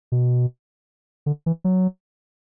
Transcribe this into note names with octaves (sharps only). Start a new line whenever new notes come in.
B2
D3
E3
F#3